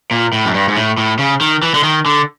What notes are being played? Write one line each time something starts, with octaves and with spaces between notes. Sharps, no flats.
A#2
A2
F#2
G2
G#2
A2
A2
C#3
D#3
E3
D3
D#3
D3